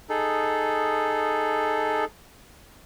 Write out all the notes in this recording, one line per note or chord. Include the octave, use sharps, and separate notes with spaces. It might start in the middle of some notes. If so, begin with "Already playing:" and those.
D#4 G#4 A4